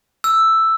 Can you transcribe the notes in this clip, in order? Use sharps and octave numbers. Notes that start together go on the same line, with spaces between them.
E6